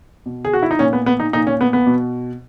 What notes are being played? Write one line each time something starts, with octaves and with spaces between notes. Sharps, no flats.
B2
G#4
F#4
E4
D#4
A#2 C#4
B3
B3
D#4
A#2 D#4
C#4
B3
B3
B2